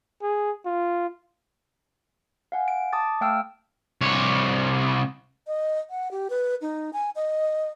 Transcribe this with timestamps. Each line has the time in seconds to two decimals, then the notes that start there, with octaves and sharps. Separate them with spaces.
0.23 G#4
0.66 F4
2.52 F5 F#5 G#5
2.68 D7
2.93 A5 D6 D#6 A6
3.21 A3 F5 G5 E6 F6
4.01 C2 C#5
5.47 D#5
5.90 F#5
6.11 G4
6.30 B4
6.61 D#4
6.93 G#5
7.15 D#5